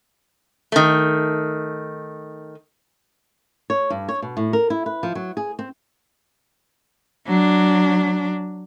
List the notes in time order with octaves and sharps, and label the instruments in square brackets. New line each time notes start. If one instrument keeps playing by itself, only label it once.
[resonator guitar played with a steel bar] D#3 A3
[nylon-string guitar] C#5
G2
C#5
B2
A2
A#4
E4
B4
F3
F#3
G#4
C4
[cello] F#3 D4